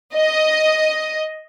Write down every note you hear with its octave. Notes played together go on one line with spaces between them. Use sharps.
D#5